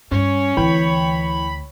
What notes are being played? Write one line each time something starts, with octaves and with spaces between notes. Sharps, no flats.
G2 C#4 C#5
D2 E3 C4 G5 B5